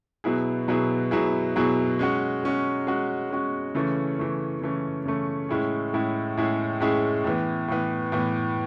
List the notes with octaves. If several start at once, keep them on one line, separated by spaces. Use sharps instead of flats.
B2 F#3 B3 E4 G#4
B2 F#3 B3 E4 G#4
B2 F#3 B3 E4 G#4
B2 F#3 B3 E4 G#4
G#3 C#4 F#4
G#3 C#4 F#4
G#3 C#4 F#4
G#3 C#4 F#4
C#3 E3 A3 C#4
C#3 E3 A3 C#4
C#3 E3 A3 C#4
C#3 E3 A3 C#4
A2 G#3 C#4 E4 G#4
A2 G#3 C#4 E4 G#4
A2 G#3 C#4 E4 G#4
A2 G#3 C#4 E4 G#4
A2 E3 B3
A2 E3 B3
A2 E3 B3